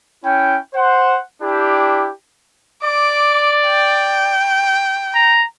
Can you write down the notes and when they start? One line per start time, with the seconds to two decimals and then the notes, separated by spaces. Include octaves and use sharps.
0.24 C#4 E4 G5
0.74 C5 F#5
1.42 D4 E4 G4
2.84 D5 D6
3.68 G5
5.14 A#5